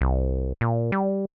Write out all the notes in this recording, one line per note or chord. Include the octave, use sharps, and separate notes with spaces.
C2
A#2
G3